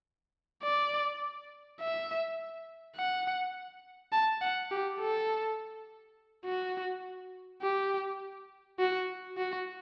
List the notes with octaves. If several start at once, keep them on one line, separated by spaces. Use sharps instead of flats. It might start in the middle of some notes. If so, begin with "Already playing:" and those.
D5
E5
F#5
A5
F#5
G4
A4
F#4
G4
F#4
F#4